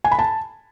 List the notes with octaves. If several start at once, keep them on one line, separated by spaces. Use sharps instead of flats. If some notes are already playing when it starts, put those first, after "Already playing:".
G#5
B5
A5